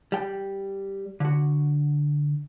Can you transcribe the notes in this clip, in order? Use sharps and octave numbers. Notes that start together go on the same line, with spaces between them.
G3 G5
D3 F#4